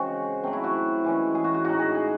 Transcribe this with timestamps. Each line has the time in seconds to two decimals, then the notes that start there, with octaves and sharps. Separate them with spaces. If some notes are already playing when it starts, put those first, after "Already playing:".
Already playing: C#3 G#3 C4 F#4
0.43 F#3 A3 C4
0.53 E4
0.64 F#4
1.04 E3 G#3 C#4
1.35 G#4
1.44 F#4
1.54 F#4
1.65 A2 G#3 D#4 F#4
1.79 G#4
1.95 G#4